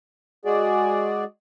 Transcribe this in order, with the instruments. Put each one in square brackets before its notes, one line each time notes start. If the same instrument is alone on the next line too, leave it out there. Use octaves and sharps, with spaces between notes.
[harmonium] G#3 F#4 G#4 D5